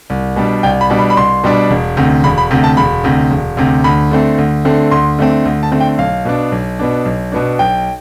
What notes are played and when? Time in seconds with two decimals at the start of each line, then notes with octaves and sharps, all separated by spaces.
0.10 C2
0.36 B2 G3 D4
0.63 C2 G5
0.81 B5
0.90 B2 G3 D4
0.99 B5
1.10 B5
1.17 C2 C6
1.44 B2 G3 D4
1.71 E1
1.97 D2 C3
2.24 E1 B5
2.38 B5
2.51 D2 C3
2.64 A5
2.77 E1 B5
3.04 D2 C3
3.31 E1
3.57 D2 C3
3.84 D2 B5
4.11 D3 A3 C4
4.38 D2
4.65 D3 A3 C4
4.91 D2 C6
5.19 D3 A3 C4
5.45 D2
5.63 A5
5.72 D3 A3 C4
5.80 G5
5.98 B1 F5
6.25 B2 B3 D4
6.52 B1
6.79 B2 B3 D4
7.05 B1
7.32 B2 B3 D4
7.59 B1 G5